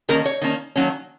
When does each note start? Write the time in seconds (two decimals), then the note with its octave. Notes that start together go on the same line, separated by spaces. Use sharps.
0.09 D#3 A#3 C#4 A#4
0.25 C#5
0.41 D#3 A#3 C#4
0.76 D#3 F#3 A#3 C#4